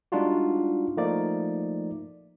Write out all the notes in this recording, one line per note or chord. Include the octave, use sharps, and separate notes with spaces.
G3 G#3 D4 D#4 F4 F#4
F3 A3 A#3 D#4 D5